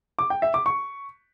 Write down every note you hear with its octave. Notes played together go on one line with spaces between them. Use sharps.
D6
G5
E5
D6
C#6